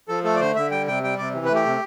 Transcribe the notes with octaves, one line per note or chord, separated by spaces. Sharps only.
F3 A4
A3 A4
D5
D3 C5
D3 E5
G3 G5
C3 G5
G3 G5
C3 D5
E3
B4
A3 G4
C3